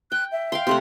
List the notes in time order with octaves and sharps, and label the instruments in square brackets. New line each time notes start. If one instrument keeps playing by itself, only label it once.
[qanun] G5 [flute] F#6
[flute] E5
[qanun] F5 G5 C6
[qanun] C3 A3 F#5 [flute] C6